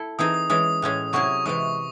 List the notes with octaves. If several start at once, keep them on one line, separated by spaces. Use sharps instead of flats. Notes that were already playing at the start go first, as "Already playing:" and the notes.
Already playing: E4 A4
E3 C4 D#4 G#4 D#6
D#6
E3 G#3 C#4 D#6
A2 G#3 C#4 G#4
C3 F#3 C#4 E4 G#4 C#6
C3 E3 G#3 D#6